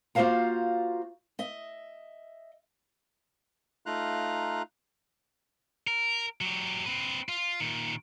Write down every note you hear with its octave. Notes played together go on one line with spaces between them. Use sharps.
A#3 F4 F#4 C5 F5 A#5
D#5 E5
A3 D#4 F4 F5 A#5 F#6
A#4
F#3 G4
C4 B4
F4
A#2 D#3